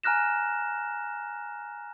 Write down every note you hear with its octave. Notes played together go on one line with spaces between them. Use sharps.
G#5 A#5 F6 F#6 A#6 E7